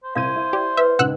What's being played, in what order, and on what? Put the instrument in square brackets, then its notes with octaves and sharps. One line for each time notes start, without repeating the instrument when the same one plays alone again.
[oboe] C5
[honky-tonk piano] C2 G#6 D#7 [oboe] C5 [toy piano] F5
[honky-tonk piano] E4
[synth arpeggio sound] G4 [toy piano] D5
[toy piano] B4 [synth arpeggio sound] E5
[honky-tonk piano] C#2 G#2 [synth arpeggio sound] F#5 E6 F#6